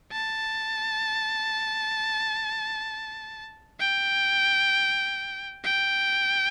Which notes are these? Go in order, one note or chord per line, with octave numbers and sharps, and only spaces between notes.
A5
G5
G5